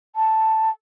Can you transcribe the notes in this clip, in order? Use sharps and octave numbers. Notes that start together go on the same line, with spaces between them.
A5